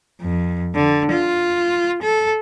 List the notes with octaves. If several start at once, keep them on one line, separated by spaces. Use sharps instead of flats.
F2
D3
F4
A4